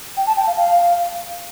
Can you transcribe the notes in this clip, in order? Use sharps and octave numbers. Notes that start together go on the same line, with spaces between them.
G5
A5
G5
F5
F5